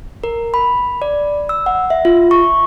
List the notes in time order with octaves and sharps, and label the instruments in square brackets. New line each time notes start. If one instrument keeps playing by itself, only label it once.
[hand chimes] A#4
B5
D5
E6
F#5
E5
F4
C#6